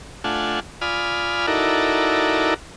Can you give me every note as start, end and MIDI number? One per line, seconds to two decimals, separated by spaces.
0.24 0.60 57
0.24 0.60 62
0.24 0.60 65
0.24 0.60 78
0.24 0.60 80
0.81 1.46 65
0.81 1.46 74
0.81 1.46 80
0.81 1.46 83
0.81 1.46 87
0.81 1.46 89
1.47 2.54 63
1.47 2.54 64
1.47 2.54 66
1.47 2.54 69
1.47 2.54 70
1.47 2.54 74